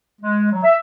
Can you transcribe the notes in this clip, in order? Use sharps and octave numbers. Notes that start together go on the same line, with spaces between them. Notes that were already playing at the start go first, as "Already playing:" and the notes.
G#3
F#3
E5